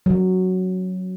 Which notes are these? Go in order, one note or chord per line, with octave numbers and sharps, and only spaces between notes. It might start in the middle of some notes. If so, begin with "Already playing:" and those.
F#3